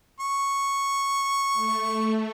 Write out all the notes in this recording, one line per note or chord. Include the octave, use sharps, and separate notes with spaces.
C#6
A3